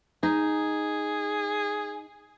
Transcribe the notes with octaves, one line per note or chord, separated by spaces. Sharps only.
D#4 G#4